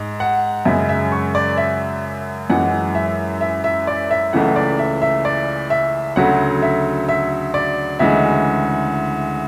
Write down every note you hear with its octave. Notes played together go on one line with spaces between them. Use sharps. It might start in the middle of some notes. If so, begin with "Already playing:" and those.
Already playing: G#2
F#5
F#2 C#3 G#3 E5
E5
C#6
D5
E5
F#2 E3 G#3 F#5
E5
E5
E5
D5
E5
C#2 C#3 E3 A3 F#5
D5
E5
E5
D5
E5
D2 C#3 F#3 A3 F#5
E5
E5
D5
D2 C#3 E3 G#3 E5